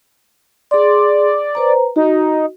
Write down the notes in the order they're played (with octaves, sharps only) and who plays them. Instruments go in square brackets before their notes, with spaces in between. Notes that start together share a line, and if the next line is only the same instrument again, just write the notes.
[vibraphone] G#4 C6 [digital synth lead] D5
[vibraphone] B4 C5 A#5
[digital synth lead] D#4 [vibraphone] F#4